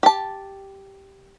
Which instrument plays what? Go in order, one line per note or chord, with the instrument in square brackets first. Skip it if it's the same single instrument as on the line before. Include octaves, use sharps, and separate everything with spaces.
[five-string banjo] G4 A5